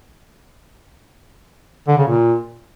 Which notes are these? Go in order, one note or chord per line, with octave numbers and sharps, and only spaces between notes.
D3
C#3
A#2